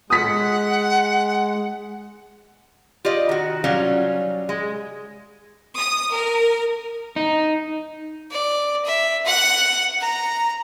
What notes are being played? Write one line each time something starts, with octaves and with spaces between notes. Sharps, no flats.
G#3 F#5 D#6 B6
F4 G4 D5 D#5
D#3 F#4
F#3 G3 C#4 F4
G#3
D#6
A#4
D#4
D5
E5
F#5
A#5